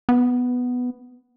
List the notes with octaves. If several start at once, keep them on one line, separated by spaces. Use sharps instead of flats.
B3